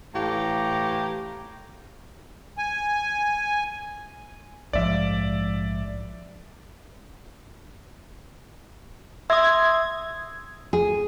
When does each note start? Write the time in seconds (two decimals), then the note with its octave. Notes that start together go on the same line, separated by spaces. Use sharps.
0.15 A2 E3 G4 F5 A#5
2.58 G#5
4.73 A#1 G#2 F3 D5 E5
9.30 E5 C6 D#6 E6 G#6
10.73 G#4